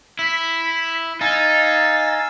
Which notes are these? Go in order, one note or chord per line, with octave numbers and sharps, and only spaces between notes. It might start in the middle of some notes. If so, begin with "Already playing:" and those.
E4 B6
D#4 F5 G#5 E6 A6